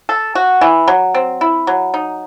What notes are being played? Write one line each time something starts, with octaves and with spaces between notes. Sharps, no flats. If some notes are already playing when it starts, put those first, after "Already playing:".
A4
F#4
E3
F#3
C4
E4
F#3
D#4